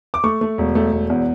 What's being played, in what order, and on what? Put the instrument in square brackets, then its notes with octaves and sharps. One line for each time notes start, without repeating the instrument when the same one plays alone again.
[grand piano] D6
A3 C#6
A3
E1
A3
E1
E2